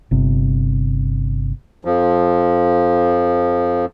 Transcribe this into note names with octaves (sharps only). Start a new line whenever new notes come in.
G1 C3
F2 F3